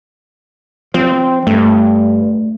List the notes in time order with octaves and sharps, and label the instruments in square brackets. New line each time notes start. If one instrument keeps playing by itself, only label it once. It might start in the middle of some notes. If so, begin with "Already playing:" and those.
[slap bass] F3 [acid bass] C4
[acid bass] G2 [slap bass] A3